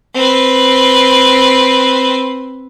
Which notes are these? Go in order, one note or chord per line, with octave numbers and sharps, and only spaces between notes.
C4 B4